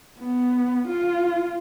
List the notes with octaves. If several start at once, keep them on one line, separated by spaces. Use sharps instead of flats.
B3
F4